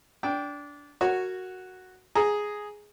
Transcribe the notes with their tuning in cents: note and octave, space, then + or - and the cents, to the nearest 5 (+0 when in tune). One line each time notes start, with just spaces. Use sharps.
D4 -20 G5 +0
F#4 +0 A#4 -20 C#5 -10
G#4 +0 A#5 +0